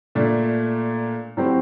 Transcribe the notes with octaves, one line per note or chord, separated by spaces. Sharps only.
A#2 A3 D4
A2 F#3 C4 G4 C5